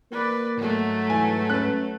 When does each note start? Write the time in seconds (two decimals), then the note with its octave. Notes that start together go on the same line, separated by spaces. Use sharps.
0.11 A#3 B4 D5
0.58 G#2 F#3 A3
1.10 E3 G#5
1.50 C#4 B4 F#6